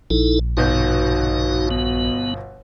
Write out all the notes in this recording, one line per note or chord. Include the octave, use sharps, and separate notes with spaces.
A#1 D#4 E4 A4
G1 B2 D#4 F#4 G6
B3